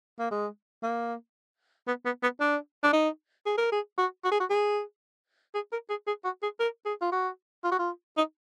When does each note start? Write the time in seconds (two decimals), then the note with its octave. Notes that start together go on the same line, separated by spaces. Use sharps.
0.19 A#3
0.31 G#3
0.83 A#3
1.88 B3
2.05 B3
2.23 B3
2.40 D4
2.83 D4
2.93 D#4
3.46 G#4
3.58 A#4
3.72 G#4
3.98 F#4
4.24 F#4
4.32 G#4
4.40 F#4
4.50 G#4
5.55 G#4
5.72 A#4
5.90 G#4
6.07 G#4
6.25 F#4
6.43 G#4
6.60 A#4
6.85 G#4
7.01 F4
7.12 F#4
7.64 F4
7.72 F#4
7.79 F4
8.17 D#4